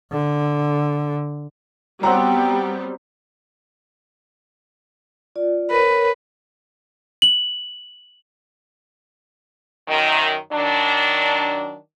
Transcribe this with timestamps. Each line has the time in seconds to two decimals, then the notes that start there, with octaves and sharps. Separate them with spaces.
0.11 D3
2.03 F#3 G3 B3 C4 F#5 G5 A#5
5.36 F4 D5
5.71 A#4 B4 C#5
7.22 F#7
9.88 F#2 D#3
10.52 D#3 F#3 D4